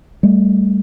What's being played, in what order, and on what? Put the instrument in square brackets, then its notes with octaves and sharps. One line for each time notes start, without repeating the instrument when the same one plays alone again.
[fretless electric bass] G3 A3